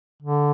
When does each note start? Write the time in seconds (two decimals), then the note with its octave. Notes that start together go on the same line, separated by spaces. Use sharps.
0.23 D3